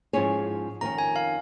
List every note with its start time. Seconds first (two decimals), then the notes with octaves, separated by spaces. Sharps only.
0.13 G#2 F3 C#4 G#4 C#5
0.81 F2 D#3 C#4 A#4 A#5
0.98 G#5
1.16 F5